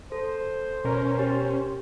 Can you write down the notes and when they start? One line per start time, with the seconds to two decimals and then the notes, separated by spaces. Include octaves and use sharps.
0.12 A4 C5
0.84 B2 C#4 A#4
1.19 G4